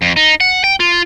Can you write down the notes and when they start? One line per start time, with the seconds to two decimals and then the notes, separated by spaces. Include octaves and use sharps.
0.02 F2
0.16 D#4
0.41 F#5
0.64 G5
0.80 F4